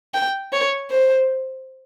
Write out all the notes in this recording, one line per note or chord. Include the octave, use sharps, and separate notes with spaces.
G5
C#5
C5